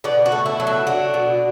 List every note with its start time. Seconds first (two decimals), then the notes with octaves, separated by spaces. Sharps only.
0.04 B2 D5
0.26 F#4
0.32 A3
0.46 E4
0.60 F#3
0.67 E4
0.87 D4 F#4
1.14 B2